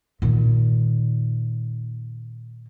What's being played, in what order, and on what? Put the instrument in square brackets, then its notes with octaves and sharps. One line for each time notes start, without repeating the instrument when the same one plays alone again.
[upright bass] A#2 D#3